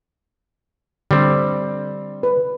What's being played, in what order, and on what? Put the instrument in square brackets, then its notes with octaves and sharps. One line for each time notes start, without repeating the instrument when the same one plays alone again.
[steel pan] D3 [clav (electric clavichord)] G3 C4
[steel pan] B4